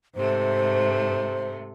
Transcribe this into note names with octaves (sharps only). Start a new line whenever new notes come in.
G#2 C3 A3 C5